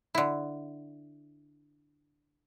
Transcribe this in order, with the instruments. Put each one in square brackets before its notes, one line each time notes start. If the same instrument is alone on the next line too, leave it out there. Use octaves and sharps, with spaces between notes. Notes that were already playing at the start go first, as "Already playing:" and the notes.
[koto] D3 E4